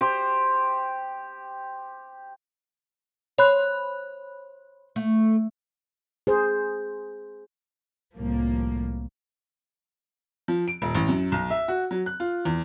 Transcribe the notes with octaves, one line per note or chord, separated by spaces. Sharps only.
G4 C5
C5 C#5 B5 F#6
A3
G#4 C5
C2 A2 F3 A#3
F3
D7
D#1
A1
F#2
B1
E5
F#4
F#3
F#6
F4
E2